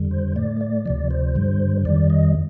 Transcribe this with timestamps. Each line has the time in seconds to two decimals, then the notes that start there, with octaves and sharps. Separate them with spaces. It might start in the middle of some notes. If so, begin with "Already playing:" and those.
Already playing: F2 D3 G3
0.11 C5
0.36 A2 A3 D5
0.61 D5
0.86 D2 C3 F3 D5
1.11 C5
1.35 G2 D3 G3
1.85 F2 D#3 G3 D5
2.10 D#5